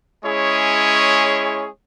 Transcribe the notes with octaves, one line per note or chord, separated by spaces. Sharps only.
G#3 C#4 E4 G#4 C#5